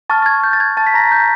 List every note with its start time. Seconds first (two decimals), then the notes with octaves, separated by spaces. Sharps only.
0.10 A5 C#6 F6 A6
0.22 A6
0.26 G#6
0.44 G6
0.53 A6
0.60 G#6
0.77 A5 A6
0.87 B6
0.94 A#5 A#6
1.12 G6